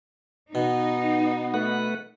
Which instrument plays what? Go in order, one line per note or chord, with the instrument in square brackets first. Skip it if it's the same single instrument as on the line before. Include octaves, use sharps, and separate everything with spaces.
[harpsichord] B2 [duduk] B3 [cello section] D#4
[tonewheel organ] A3 B4 F#5